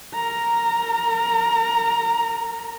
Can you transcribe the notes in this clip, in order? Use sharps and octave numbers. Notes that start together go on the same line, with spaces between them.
A#4 A#5